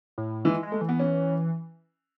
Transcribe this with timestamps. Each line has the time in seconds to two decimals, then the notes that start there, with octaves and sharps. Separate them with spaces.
0.18 A2
0.45 E3 G#3
0.63 G#3
0.72 A3
0.81 E3
0.89 B3
1.00 C#4